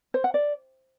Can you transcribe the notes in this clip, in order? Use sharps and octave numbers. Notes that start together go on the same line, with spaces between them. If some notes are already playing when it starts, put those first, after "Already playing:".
C5
F#5
D5